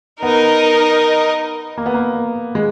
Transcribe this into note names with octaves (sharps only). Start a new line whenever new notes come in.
B3 D#4 A#4 D#5
A#3
B3
A#3
G#3